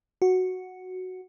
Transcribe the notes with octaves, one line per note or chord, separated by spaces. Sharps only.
F#4